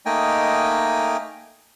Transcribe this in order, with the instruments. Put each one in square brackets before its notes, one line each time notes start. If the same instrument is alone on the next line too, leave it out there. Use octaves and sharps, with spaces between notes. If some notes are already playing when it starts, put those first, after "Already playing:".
[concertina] A3 A#3 D#4 D#5 G5 G#5